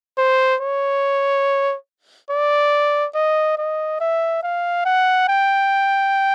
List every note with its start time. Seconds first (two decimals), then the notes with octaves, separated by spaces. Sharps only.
0.18 C5
0.61 C#5
2.30 D5
3.15 D#5
3.58 D#5
4.00 E5
4.43 F5
4.85 F#5
5.28 G5